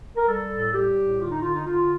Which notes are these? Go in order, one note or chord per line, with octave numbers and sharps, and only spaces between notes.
A#4
G3 A4
A2
G3 G4
A2
D3 F4
D#4
D3 F4
D#4
D3 F4